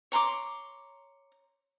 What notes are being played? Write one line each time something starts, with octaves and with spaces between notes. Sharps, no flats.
C#5 A#5 C6 D6